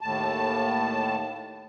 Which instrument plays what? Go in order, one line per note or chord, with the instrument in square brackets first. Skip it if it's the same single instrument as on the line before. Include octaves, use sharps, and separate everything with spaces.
[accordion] D#2 A2 A5